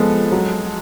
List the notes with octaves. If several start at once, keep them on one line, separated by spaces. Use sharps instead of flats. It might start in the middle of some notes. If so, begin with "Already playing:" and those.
Already playing: F3 G#3 B3 A4
F#3